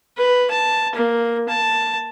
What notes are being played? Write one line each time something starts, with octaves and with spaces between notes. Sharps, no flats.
B4
A5
A#3
A5